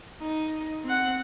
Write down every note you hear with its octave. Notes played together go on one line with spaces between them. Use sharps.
D#4
C4 F#5